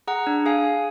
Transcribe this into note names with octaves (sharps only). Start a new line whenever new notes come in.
G#4 F#5 A#5
D4
G#4 F5 G#5
G#4